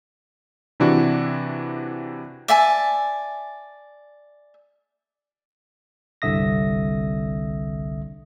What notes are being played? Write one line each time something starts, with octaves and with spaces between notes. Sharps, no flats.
C3 E3 D4 E4 F#4
D5 E5 G#5 A5
G1 C2 D3 E5 D#6 A#6